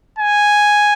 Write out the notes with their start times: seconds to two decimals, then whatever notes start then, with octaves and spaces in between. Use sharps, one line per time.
0.19 G#5